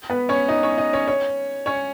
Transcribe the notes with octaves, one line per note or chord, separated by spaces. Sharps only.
B3 B4
C#4 C#5
D#4 D#5
C#4 C#5
D#4 D#5
C#4 C#5
C#4 C#5
C#4 C#5